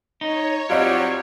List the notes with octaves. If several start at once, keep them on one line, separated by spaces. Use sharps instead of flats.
D#4 C#5
F#3 G3 C4 F4 D#5